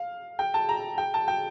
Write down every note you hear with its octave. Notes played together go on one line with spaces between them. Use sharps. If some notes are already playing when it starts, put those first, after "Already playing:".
Already playing: F5
G5
A5
A#5
G5
A5
G5